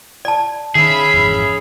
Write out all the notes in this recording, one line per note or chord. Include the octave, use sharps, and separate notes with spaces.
D5 A5
D#3 C#4 G#4 E5 B5
G#1 F2 E3